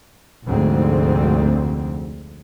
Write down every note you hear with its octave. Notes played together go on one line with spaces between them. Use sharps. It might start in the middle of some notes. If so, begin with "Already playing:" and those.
F1 D2 G#2 C4